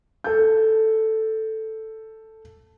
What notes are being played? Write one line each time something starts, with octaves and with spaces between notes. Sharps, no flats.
A4 G6